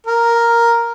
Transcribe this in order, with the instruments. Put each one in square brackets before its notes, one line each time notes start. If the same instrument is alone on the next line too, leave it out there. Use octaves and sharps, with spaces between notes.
[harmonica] A#4